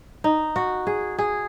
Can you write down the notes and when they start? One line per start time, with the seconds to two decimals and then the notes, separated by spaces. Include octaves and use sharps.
0.24 D#4
0.56 F#4
0.87 G#4
1.18 G#4